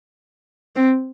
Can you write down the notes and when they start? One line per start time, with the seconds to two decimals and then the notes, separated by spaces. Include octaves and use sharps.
0.76 C4